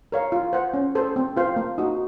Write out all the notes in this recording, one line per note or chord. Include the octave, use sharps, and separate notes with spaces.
A#4 C#5 F5
F4
C5 F#5
C#4
A4 C5
C4
F4 C5 F5
A#3
D#4 F#4